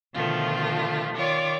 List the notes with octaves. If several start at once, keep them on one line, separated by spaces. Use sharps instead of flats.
B2 D3 D#3 F3 A3 F4
D#3 F4 C#5 D5 D6